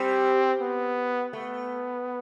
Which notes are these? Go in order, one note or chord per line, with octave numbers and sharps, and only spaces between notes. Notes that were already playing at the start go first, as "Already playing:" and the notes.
Already playing: G3 C4
B3
A3 B3